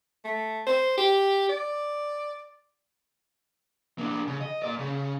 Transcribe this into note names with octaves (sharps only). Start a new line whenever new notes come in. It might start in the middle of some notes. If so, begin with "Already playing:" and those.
A3
C5
G4
D5
A#3 D4
C#3
D#5
A#3 D5
C#3